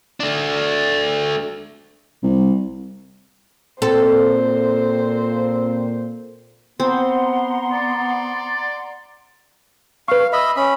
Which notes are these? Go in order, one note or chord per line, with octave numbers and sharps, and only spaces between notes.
A3 D4
C2
A#2 C4 A4 C5
B3 C4 F#5 A#5 C6
D5
B4 F5 C#6
D#5 E5 B5
C#4 B5